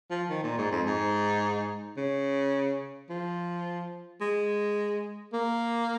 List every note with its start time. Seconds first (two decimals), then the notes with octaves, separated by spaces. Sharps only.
0.10 F3
0.29 D#3
0.43 A#2
0.58 G#2
0.71 F2
0.86 G#2
1.97 C#3
3.10 F3
4.21 G#3
5.33 A#3